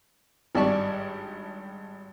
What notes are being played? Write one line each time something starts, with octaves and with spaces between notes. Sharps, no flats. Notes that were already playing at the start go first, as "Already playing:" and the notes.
G#1 G2 G4 D5 A5 C#6